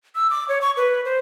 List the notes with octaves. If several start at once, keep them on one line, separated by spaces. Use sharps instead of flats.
E6
D6
C#5
C#6
B4
C5